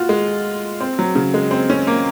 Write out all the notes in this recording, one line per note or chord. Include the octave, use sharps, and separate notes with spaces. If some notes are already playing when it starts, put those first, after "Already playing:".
Already playing: F4 F#4
G#3
C4
F#3
C#3
G#3
C4
C#4
A#3